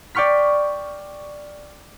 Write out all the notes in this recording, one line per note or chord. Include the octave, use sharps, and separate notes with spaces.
D5 G5 C#6 F6 B6